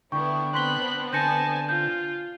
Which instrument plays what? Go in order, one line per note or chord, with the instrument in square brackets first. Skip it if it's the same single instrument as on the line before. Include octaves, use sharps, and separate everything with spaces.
[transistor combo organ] D3 G5 [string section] B3 D4 E4 [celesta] C#6
[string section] B3 C4 D4 [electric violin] B5 F#6 [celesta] C6 B6 G7
[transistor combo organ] D3 [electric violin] G#5 A5 [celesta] G6 A#6 C#7
[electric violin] F4 [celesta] G6